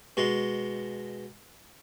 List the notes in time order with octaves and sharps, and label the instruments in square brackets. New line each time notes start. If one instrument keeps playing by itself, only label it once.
[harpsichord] B2 G#3